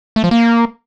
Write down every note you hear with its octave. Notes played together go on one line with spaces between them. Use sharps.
A3
F3
A#3